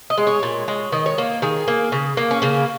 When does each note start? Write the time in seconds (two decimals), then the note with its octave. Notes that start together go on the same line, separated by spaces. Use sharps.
0.10 D#5
0.18 G#3
0.27 C#5
0.43 A#2
0.68 G#3
0.92 D#3 D#5
1.06 C#5
1.18 A#3
1.42 D#3 G#4
1.68 A#3
1.92 C#3
2.17 A#3
2.31 C#4
2.42 C#3 A#3